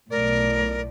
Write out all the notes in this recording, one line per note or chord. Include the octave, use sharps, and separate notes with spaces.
B1 A2 A#4 D5